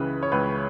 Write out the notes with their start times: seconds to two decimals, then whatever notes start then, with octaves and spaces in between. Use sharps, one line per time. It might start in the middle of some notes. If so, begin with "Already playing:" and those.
Already playing: C#2 C#3 E3 B4
0.23 C#5
0.32 C#2 B4